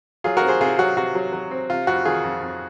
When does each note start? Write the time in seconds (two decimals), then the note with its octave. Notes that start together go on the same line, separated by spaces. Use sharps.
0.24 F#3 F4 G#4
0.37 F#4 A#4
0.43 C4
0.48 G#4 C5
0.61 C3 F4 G#4
0.78 F#3 F#4
0.97 C3 F#4
1.15 F#3
1.33 F#3
1.51 C4
1.70 C3 F4
1.87 F2 F#4
2.05 D#3 F4 G#4
2.24 F2
2.41 F2